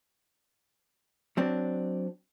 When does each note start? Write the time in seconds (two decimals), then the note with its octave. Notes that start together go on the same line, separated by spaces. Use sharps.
1.37 F#3 C4 D4